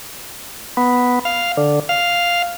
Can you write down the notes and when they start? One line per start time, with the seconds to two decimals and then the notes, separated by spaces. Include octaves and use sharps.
0.77 B3
1.25 F5
1.57 D3
1.89 F5